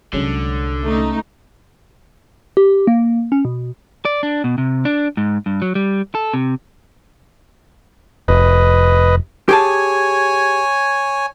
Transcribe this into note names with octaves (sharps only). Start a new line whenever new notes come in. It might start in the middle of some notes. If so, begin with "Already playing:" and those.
C2 D3 F#3 G#3 C#4
A3 D#4
G4
A#3
C#4
B2
D5
D4
B2
C3
D4
G#2
G2
F#3
G3
A4
C3
F1 B4 D#5
G4 G#4 C#5 G#5 A5